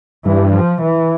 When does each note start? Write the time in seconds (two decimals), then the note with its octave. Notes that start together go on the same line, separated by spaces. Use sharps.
0.25 G2 E3
0.53 F3
0.82 E3